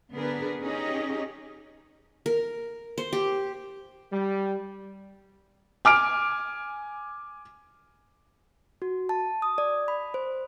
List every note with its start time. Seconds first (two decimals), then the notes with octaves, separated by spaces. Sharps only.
0.15 D3 B3 D4 G#4 A#4 B4
0.63 C#4 D#4 G4 G#4 D#5
2.26 A#4
2.98 C5
3.13 G4
4.12 G3
5.85 G#5 D6 F6 D7
8.82 F#4
9.09 A5
9.42 D#6
9.58 D5
9.88 B5
10.14 C5